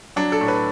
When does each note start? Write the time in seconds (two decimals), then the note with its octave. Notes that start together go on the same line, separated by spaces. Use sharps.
0.16 F#3 D4
0.32 A4
0.41 A2
0.48 B4